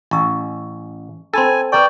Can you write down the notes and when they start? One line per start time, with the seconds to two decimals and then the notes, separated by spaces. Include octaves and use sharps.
0.11 A1 A#5 C#6 E6
1.34 C4 D4 A4 G#5 B5 C6
1.72 B4 D5 G5 A#5 C#6